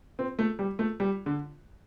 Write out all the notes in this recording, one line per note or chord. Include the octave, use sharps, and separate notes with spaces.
C4
A3
G3
A3
G3
D3